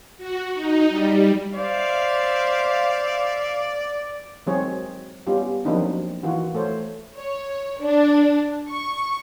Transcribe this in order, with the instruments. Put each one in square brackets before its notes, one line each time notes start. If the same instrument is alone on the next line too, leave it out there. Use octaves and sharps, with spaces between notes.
[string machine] F#4
D#4
G3
[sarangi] C5 [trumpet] D5 [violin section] E5 F5
[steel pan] D#3 F#3 G#3 C4 G#4 C#5
G3 B3 C#4 F4 G4
F3 F#3 A#3 C4 D4 D#4
D#3 E3 F4 F#4
A3 A4 C5 C#5
[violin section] C#5
D4
C#6